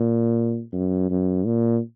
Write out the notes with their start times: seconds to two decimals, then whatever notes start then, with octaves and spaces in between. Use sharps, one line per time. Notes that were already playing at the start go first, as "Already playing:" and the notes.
Already playing: A#2
0.73 F#2
1.10 F#2
1.46 A#2